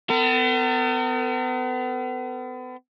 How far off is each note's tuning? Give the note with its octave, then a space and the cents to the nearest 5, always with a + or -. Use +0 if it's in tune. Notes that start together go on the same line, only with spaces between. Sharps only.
B3 +40 A#4 -45